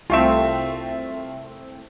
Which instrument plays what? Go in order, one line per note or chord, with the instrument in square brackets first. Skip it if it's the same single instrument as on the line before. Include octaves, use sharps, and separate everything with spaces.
[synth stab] C2 A3 C4 [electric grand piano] F4 E5